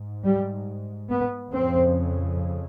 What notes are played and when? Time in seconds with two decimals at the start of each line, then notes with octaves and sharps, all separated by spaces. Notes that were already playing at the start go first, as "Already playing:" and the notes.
Already playing: G#2
0.24 G3
1.10 B3
1.53 F2 C#3 C4